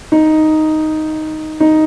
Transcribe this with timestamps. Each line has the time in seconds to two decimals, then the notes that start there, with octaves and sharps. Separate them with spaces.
0.12 D#4
1.60 D#4